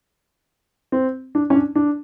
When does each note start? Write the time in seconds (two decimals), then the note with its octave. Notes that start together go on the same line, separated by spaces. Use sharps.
0.92 C4
1.35 D4
1.50 C#4
1.55 D4
1.75 D4